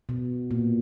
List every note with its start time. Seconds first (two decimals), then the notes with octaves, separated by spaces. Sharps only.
0.09 B2
0.51 A#2